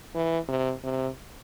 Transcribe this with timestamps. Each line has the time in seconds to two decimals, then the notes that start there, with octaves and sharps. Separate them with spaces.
0.14 E3
0.48 C3
0.83 C3